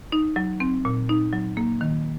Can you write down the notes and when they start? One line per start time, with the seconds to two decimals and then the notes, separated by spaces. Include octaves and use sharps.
0.12 D#4
0.36 F#3
0.60 C4
0.85 A#2
1.09 D#4
1.33 F#3
1.57 A#3
1.81 D#3